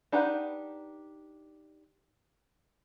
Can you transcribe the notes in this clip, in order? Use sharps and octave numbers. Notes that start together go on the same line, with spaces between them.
D4 D#4 G4 B4 F#5